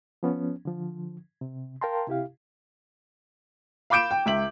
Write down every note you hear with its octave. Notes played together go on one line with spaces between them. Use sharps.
F3 B3 C#4
D3 F3
C3
A#4 F5 G5 A5 A#5 C6
C3 E4 G4 F5
F5 B5 D6 G6 D7 E7
G5
C#2 E5 F#7